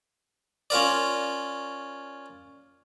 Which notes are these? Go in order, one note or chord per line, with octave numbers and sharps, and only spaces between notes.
C#4 F4 A#4 D5